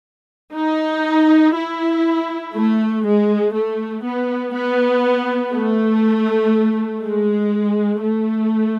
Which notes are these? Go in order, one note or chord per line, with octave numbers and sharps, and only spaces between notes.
D#4
E4
A3
G#3
A3
B3
B3
A3
G#3
A3